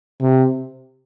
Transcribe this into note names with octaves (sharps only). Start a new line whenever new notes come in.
C3